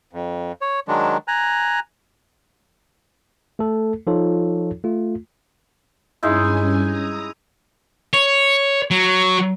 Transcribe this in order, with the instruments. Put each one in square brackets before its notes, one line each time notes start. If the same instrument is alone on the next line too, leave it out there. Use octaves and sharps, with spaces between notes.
[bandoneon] F2
C#5
D#3 F#3 G#3 D4
G#5 A#5 F#6
[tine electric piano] A3 A4
F3 D#4 F4 A4 C#5
A3 F4
[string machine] G2 C#4 G#5 [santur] G#3 D#4 E4
[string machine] A#5 D#6
[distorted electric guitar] C#5
F#3